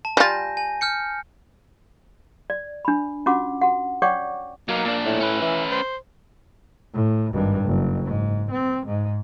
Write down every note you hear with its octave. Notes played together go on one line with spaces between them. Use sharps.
A5
G3 F4 G#5 G6 A#6
G#5
F6 G6 C#7
D5
D4 B5
C#4 F4 F#4 F#5 D6
F#4 F#5
C#5 D5 F#5 G5 C#6 D6
F#3 A#3 D#4
A#2 D4
A2
C#4 B4
E3
C5
A2
G#1 G2
F#1
G#2
C4
G#2